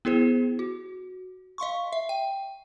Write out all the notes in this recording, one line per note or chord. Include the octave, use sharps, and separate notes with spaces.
B3 E4 G#4 C5
F#4
D#5 F5 C6 C#6
E5
G5